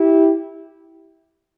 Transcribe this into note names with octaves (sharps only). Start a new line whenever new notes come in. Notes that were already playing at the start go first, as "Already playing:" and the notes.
Already playing: E4 G4